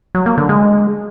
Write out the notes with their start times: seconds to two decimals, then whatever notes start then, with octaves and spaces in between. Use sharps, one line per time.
0.15 F#3
0.26 A#3
0.38 D3
0.49 G#3